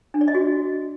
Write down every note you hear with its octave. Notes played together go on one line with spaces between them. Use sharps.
D4
D5
D#5
F#4